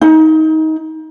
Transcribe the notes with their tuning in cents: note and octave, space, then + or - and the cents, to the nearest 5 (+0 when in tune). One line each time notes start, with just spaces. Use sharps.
D#4 +20